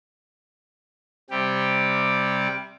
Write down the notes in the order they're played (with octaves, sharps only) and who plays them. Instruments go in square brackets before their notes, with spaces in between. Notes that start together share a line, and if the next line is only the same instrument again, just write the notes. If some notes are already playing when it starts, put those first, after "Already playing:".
[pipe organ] C3 G3 G4